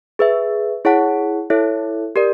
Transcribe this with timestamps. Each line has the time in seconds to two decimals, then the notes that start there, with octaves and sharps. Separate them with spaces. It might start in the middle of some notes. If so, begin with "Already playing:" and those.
0.19 G#4 B4 E5
0.85 E4 G#4 C#5 F#5 A5
1.50 E4 A4 C#5 E5
2.16 G4 A#4 D5